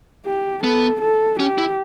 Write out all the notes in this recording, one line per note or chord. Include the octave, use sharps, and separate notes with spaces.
G4
B3 A4
A4
C#4 G4
E4